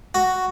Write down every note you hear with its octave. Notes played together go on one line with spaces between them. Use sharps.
F#4